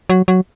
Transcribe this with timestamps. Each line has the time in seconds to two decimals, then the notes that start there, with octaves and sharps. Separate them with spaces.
0.09 F#3
0.28 F#3